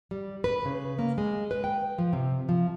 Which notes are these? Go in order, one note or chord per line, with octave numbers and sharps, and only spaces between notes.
G3
B4
C#3
A#3
G#3
B4
G5
F3
C3
F3